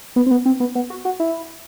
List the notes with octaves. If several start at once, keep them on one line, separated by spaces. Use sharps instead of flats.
B3
C4
B3
C4
B3
B3
F#4
F#4
E4